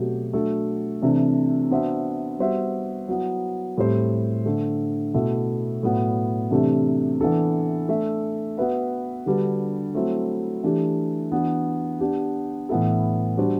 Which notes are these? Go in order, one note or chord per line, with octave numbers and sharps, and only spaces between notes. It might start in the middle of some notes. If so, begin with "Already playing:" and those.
Already playing: B2 F#3 A3 C4 G4
F#3 A3 D4 A4
C3 E3 A3 D4
B3 D4 F#4 C5 E5
G3 B3 F#4 C5 E5
F#3 B3 E4
A2 G3 C4 G4 C5
D3 A3 D4
B2 A3 E4
A2 F#3 B3
C3 E3 A3 D4 G4
E3 B3 D4 A4
A3 D4 A4 E5
B3 F#4 B4 E5
D3 G3 D4 F#4 B4
F#3 A3 C4 E4
E3 A3 D4 G4
E3 B3 D4 F#4
B3 D4 G4
A2 E3 B3 E4 A4
G3 D4 F#4 C5